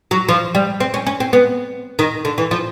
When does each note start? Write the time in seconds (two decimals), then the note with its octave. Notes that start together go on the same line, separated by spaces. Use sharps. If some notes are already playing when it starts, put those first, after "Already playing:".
0.11 F#3
0.29 F3
0.55 G3
0.80 C4
0.94 C#4
1.06 C#4
1.20 C4
1.33 B3
1.99 D#3
2.25 D3
2.38 E3
2.51 F3